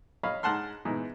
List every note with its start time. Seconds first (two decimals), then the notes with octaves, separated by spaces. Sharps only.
0.23 C#5 D#5 F5 B5
0.43 G#2 F#5 A5 C6 F6
0.85 G#2 B2 E3